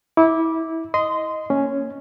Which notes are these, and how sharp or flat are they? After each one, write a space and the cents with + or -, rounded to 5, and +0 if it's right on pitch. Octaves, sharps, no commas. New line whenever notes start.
E4 -25 D6 +0
D#5 +5 C6 -20
A#3 -10 C#4 +0